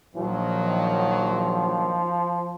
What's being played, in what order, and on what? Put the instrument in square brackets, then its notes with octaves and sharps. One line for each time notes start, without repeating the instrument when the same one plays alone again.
[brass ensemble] A#1 D#3 F#3 [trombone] F3